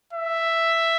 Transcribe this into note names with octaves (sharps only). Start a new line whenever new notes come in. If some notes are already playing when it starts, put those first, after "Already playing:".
E5